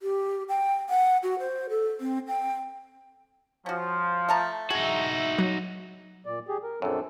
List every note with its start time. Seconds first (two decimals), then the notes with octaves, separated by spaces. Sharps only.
0.02 G4
0.49 G5
0.89 F#5
1.23 F#4
1.39 C5
1.70 A4
2.01 C4
2.27 G5
3.66 F3 C#4 F#4
4.29 A3 A5 A#5
4.70 D#4 F#4 G#4 E5
5.39 F#3
6.26 A#2 D5
6.48 G4 G#4
6.63 A#4
6.82 A#1 F#2 C4 D4 A4